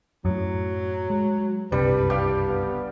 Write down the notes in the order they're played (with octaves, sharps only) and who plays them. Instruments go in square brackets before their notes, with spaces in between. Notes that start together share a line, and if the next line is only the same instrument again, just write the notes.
[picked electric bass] F#2 A2 [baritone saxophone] F#3
[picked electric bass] G#3
[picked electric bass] F#1 C2 C3 [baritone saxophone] G2 [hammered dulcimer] G3 [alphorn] B4
[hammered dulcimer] G4 F5
[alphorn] B3